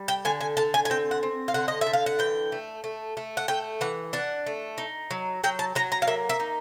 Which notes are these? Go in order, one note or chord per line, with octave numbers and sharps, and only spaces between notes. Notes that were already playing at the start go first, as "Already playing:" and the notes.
Already playing: G3
G5
D3 G#5
G#5
D3 A5
G#5
G#5
C4 G5
F#5
C4
F5
D3 F#5
D#5
E5
D3
F5
F#5
E3 G5
A3
A3
A3
F#5
A3 G5
E3 F#5
D4 F#5
A3
D#4
F#3
F#3 G5
A5
F#3 A#5
A#5
F5
A#3 E5
E5
D#4